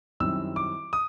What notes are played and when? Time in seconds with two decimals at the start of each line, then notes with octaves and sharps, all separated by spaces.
0.20 F#2 D#3 G3 C4 E4 E6
0.56 D6
0.93 D#6